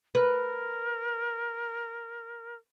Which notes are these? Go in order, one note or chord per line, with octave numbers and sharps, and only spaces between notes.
A#4 B4